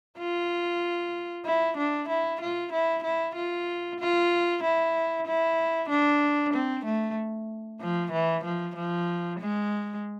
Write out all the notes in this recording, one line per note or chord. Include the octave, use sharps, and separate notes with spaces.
F4
E4
D4
E4
F4
E4
E4
F4
F4
E4
E4
D4
C4
A3
F3
E3
F3
F3
G#3